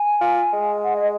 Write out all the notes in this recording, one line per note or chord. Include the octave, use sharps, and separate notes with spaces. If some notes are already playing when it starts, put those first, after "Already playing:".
Already playing: G#5
F4
G#3
F#5
D#5